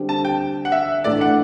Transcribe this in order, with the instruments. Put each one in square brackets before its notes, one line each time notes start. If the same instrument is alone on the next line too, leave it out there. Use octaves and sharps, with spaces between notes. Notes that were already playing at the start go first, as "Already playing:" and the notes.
Already playing: [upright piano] D3 G3 C4 G4
[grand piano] A5
G5
F#5
E5
[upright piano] A2 E3 A3 D4 [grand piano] D5
[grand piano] F#5